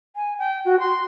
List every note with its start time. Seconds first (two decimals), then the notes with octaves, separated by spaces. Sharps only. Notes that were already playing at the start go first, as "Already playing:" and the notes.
0.16 G#5
0.39 G5
0.65 F#4
0.80 C6